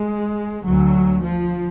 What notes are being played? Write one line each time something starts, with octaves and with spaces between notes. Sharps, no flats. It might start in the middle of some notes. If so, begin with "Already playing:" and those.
Already playing: G#3
D2 F#3
F3